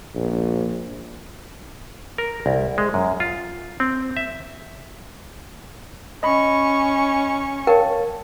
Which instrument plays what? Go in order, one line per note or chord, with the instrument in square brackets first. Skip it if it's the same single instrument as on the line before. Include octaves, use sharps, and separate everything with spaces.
[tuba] A#1
[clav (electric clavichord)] A#4
C2
G#3
F#2
F4
C4
E5
[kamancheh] C#4 C#6 [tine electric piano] D#5 B5
[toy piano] A#4 G5 [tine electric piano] C#5 F5 A5